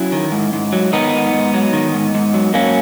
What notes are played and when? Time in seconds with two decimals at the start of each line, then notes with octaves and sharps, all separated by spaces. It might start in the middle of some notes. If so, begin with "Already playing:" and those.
Already playing: F#3 C#4 E4
0.12 D#3
0.32 G#2
0.53 G#2
0.72 F#3
0.93 D#3 B3 D#4
1.14 G#2
1.33 G#2
1.54 F#3
1.73 D#3
1.94 G#2
2.15 G#2
2.34 F#3
2.54 F#3 A#3 C#4